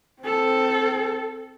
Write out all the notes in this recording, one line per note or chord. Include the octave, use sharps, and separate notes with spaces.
C4 A4